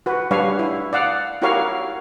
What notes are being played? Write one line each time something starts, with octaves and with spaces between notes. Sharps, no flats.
F#4 B4
G3 D4 B4 C#5 F5
E4
D5 F5 F#5
E4 F#4 G4 A#4 C#5 F5